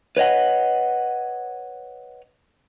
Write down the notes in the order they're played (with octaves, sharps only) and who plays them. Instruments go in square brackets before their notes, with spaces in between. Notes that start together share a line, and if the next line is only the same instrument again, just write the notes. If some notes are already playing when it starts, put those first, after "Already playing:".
[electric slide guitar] B4 C#5 D#5 F#5